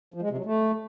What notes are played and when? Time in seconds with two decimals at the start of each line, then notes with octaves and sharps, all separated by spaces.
0.14 F3
0.22 G#3
0.30 C3
0.38 F#3
0.45 A3